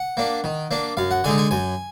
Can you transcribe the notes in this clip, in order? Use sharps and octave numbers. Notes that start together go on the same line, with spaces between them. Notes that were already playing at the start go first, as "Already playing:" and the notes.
Already playing: F#5
A#3 D4
D#3
A#3 D4
F#2 F5
F#5
D3 G#3 D#4 G#5
G#5
F#2 G#5